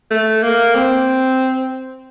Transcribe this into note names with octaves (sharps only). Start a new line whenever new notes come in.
A3
A#3
C4